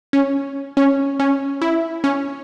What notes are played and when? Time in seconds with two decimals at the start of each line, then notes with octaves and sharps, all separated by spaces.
0.13 C#4
0.77 C#4
1.20 C#4
1.61 E4
2.04 C#4